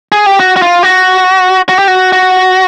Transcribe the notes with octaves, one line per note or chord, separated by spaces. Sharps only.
G#4
G4
F#4
F#4
F4
F#4
F#4
G4
F#4
F#4